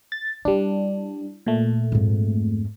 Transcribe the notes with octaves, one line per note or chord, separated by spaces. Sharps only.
A6
G3 D4 E4
A#2 A3
F2 G#2